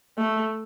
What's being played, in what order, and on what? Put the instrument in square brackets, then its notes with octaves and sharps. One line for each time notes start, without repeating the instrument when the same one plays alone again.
[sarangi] A3